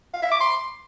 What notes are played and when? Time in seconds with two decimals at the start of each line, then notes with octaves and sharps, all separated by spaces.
0.13 F5
0.22 E5
0.31 D6
0.40 C6